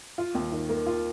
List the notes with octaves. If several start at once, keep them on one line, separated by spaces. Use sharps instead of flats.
F4
D#2
D#3
A#3
F4